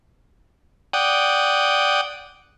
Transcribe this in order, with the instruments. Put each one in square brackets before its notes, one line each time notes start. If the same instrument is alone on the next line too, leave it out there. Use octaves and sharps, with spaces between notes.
[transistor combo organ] D5 F#5 G5 D#6